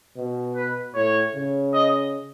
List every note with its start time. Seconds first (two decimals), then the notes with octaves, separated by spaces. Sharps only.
0.17 B2
0.55 B4
0.95 A2 C#5
1.34 C#3
1.73 D#5